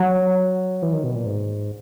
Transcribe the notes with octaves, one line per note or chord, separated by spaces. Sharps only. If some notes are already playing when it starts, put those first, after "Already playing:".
Already playing: F#3
E3
D#3
B2
A#2
G#2